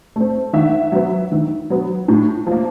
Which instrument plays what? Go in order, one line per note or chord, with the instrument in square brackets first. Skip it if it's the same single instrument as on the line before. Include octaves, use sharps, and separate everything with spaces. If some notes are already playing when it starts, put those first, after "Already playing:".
[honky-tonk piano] A3 C4
D#3 E5 F#5
F#3 B3
D#3
F#3 B3
A2
F3
A#3